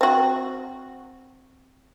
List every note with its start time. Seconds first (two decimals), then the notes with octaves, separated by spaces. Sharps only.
0.01 C4 F#4